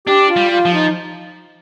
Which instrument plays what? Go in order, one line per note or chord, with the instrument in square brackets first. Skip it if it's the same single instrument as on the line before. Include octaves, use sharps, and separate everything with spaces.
[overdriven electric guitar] D4 [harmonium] G4
[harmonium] F4
[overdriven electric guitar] G3
[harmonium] F4
[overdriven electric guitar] F3
[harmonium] D#4